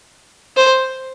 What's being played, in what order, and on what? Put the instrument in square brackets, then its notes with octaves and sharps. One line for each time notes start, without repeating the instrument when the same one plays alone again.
[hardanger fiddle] C5